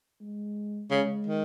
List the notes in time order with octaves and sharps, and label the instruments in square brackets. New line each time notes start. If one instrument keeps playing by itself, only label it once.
[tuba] G#3
[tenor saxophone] C#3 [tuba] G#3
[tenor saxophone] D#3